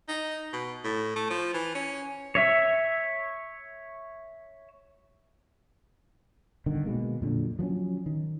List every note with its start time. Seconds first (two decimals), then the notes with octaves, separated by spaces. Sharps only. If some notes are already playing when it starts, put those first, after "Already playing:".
0.08 D#4
0.53 B2
0.84 A2
1.16 A3
1.30 F3
1.54 E3
1.75 C#4
2.35 C#5 E5
6.66 G1 D3 D#3
6.85 B2 G#3 A#3
7.21 F2 A#2 D3 F#3
7.59 F3 F#3 B3 C#4
8.06 D#3